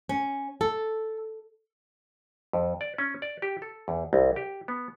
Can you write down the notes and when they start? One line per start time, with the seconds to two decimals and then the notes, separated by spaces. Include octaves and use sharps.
0.09 C#4
0.61 A4
2.53 F2
2.81 D5
2.98 C#4
3.22 D5
3.42 G4
3.62 A4
3.88 E2
4.13 C2
4.36 G4
4.68 B3